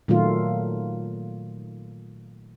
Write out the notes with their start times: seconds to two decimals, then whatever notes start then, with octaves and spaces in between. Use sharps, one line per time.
0.08 A#2 D#3 F#3 A3 F4